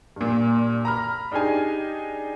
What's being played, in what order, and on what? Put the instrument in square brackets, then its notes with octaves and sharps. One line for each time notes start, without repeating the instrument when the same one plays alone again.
[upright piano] G2 A#2
A#5 B5 F6
D4 D#4 G4 G#4 G#5